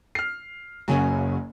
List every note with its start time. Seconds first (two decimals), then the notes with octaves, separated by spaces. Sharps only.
0.15 F6 C7
0.88 F#1 F#2 C#3 F#3 G#5